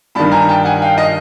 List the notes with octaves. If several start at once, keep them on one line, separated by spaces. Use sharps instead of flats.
G2 D#3 A5 B5
G#5 A#5
A#5
G5 A5
F#5 G#5
F5 G5
D#5 F5